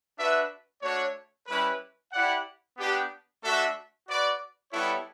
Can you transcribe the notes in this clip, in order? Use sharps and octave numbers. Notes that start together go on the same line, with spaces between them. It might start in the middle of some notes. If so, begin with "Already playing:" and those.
D4 F#4 B4 E5
A3 D4 F#4 C#5
G3 C#4 E4 B4
E4 G4 D5 F#5
B3 D4 G4
A3 D4 F#4 A4 E5
F#4 B4 D5
G3 B3 E4 A4 C#5